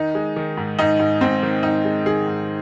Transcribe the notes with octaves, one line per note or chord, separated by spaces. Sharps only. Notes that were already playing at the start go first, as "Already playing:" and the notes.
Already playing: D#3 D#4
G#3
D#3
G#2
G#2 D#4
G#2
G#2 C4
D#3
G#2 D#4
G#3
D#3 G#4
G#2